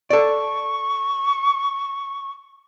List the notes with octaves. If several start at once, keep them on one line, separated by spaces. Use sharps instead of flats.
A4 D5 C#6